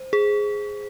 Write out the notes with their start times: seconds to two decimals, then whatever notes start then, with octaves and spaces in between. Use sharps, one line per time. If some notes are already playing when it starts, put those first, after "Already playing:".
Already playing: C5
0.13 G#4